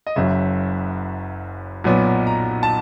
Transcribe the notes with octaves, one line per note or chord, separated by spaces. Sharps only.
D#5
F#1 F#2 C#3 E5
B1 A#2 F#3 B3
A#5
A5